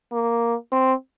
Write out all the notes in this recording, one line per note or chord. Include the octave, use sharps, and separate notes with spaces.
A#3
C4